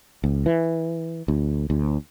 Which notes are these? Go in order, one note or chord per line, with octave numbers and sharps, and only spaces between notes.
C#2
E3
D2
D2